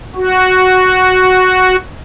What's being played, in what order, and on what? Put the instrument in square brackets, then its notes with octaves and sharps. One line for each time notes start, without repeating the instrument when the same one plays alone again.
[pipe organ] F#4